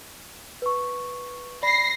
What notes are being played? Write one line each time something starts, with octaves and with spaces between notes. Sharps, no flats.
B4 C#6
D5 B5 A#6 C7